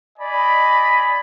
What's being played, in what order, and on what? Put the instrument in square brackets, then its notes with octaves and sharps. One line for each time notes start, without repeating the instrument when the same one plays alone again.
[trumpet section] D5 D#5 G#5 B5